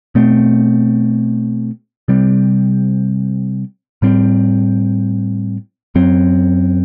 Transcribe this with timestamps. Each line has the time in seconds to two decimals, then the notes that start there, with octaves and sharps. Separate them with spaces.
0.15 B2 A3 C4
2.08 C3 G3 C4
4.02 A2 G3 C4
5.95 F#2 F#3 C4